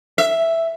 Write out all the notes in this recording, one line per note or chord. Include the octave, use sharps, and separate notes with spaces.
E5